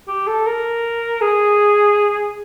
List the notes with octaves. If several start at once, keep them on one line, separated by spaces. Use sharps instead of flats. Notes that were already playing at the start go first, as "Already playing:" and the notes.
G4
A4
A#4
G#4